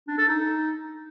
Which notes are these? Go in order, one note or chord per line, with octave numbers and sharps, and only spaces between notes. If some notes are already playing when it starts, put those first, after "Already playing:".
D4
A4
D#4